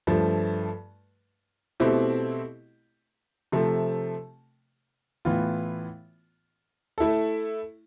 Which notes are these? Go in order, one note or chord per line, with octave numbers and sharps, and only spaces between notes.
G2 F3 A3
B2 A3 C4 E4 G4
C3 F3 A3
A2 E3 B3 F4
A3 E4 A4